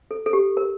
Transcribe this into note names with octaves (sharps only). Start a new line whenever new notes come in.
A4
A4
G4
A#4